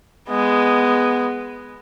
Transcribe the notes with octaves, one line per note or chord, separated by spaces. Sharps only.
G#3 B3